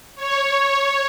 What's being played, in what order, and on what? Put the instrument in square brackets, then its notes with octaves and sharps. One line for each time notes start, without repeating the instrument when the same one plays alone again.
[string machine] C#5